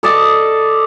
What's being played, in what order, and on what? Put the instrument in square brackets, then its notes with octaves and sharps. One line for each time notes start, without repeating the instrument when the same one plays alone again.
[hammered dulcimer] A4 D5 D#5 A5